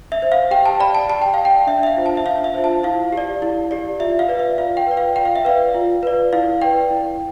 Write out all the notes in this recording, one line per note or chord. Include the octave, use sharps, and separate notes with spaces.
E5
C5
F5
G4 G5
A5
D5 B5
A5
G4 A5
G5
D5 F5
G5
D4 E5
E5
F5
F4 C5
A5
E5
D4 F5
E5
F4 C5
A5
E4 F5
G4 D5
E4
G4 D5
F4 E5
F5
B4 D5
E5
F4 F5
G5
B4 D5
F5
F4 G5
F5
E5
B4 D5 F5
F4
B4 D5
E4 F5
B4 D5 G5
E4